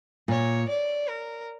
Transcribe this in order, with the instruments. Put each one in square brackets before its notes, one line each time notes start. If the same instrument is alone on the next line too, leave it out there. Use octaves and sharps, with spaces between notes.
[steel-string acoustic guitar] A#2 [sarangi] C#5
[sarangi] D5
A#4